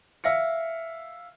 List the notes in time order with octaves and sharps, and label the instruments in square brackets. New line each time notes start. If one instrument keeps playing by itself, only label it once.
[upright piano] E5 F5 A#6 C#7